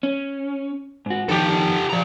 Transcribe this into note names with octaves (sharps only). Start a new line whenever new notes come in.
C#4
G#2 F#4
F2 D#3 G4 A4
F3 A#5